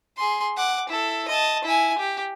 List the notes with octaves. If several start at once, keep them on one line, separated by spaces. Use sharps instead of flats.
G#4 C6
F#5 D6
E4 A4
D#5 A5
E4 G#5
G4